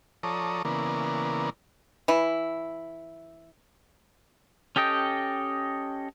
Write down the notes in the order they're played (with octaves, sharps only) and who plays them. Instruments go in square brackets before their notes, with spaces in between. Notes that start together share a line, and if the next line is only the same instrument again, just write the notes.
[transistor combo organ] F3 A4 C#5 D5 A#5 D#6
C#3 E3 A#3 B3 A#4 D5
[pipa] E3 E4
[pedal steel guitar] C#4 G4 A4 D#5 G5